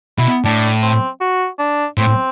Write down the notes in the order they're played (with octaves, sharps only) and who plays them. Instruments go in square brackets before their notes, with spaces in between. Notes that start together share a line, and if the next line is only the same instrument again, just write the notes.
[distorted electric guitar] B2 [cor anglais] E4
[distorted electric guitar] A2 [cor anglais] D4
[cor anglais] C4
F#4
D4
[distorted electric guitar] A2 [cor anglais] C4